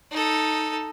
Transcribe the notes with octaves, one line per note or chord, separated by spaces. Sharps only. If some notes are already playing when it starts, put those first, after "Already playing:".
D#4 A4